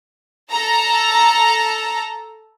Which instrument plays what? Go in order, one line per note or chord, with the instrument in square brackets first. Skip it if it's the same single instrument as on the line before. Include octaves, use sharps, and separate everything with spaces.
[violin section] A4 A5 A#5